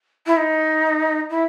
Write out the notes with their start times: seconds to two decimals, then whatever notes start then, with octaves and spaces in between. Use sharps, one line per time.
0.27 E4
0.37 D#4
1.30 E4